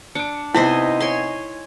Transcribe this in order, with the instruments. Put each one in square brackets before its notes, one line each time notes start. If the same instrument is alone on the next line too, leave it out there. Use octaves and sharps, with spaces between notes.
[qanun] D4 [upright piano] C#7 D7
[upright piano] C3 B3 B6 [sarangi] D#4 [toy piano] E4 [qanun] C5 D#5 G#5
[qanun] C#5 G#5 C6